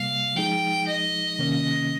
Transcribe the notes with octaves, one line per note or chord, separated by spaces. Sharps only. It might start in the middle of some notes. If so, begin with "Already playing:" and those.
Already playing: C3 G3 A#3 F5
F3 G#3 D#4 G#4 G5
D#5
C3 D#3 A#3 C#4